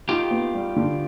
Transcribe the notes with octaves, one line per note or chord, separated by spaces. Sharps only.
D#4 F4 G4
B3
G3
D3